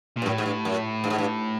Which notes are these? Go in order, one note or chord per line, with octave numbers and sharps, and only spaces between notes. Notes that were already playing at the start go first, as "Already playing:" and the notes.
A#2
G2
F#2 A2
G#2
G2
F#2
G2
G#2
G2